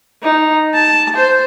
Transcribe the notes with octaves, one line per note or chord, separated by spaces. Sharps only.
D#4
A5
C5